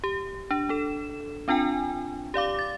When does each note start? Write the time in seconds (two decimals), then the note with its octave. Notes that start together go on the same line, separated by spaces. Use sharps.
0.04 G4
0.51 D4
0.69 D4 A4 E7
1.48 C4 D4 F4 G5 G#5
2.34 G4 D5 F5 D6
2.59 A6